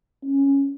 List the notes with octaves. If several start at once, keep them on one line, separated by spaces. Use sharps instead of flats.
C#4